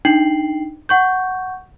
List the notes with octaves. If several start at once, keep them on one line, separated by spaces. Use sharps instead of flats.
D4 D#4 G5 C7 F#7
F#5 C#6 G6